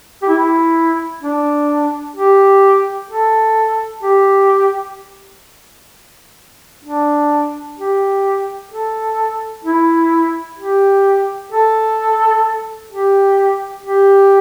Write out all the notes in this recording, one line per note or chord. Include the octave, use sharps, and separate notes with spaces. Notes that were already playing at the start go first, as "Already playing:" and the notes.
G4
E4
D4
G4
A4
G4
D4
G4
A4
E4
G4
A4
G4
G4